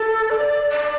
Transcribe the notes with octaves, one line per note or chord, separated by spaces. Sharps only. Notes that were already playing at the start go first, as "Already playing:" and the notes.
Already playing: A4
D5
D5